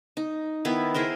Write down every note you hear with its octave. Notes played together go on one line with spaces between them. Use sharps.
D#4
D#3 B3 E4 B4
E4 G#4 A#4 C5